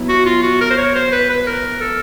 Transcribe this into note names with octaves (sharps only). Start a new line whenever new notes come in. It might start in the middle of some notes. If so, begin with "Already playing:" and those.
Already playing: F#3 B3 E4
F#4
F4
F#4
A#4
C5
C#5
C5
B4
B4
A#4
A4